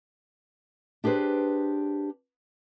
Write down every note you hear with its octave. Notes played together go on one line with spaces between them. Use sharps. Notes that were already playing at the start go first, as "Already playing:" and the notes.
D4 G4 G#4 B4 C5